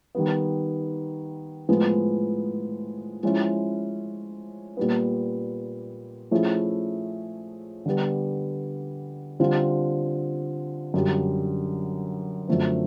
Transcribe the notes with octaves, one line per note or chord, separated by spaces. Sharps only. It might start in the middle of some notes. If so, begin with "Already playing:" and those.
D#3 G3 B3
A2 F3 G#3 B3
F3 G#3 C#4 E4
A#2 G3 B3
F3 A3 C#4 E4 G#4
D3 G3 B3
D3 G3 C4 F4
F#2 D3 G3
F#2 D3 F3 A3 C4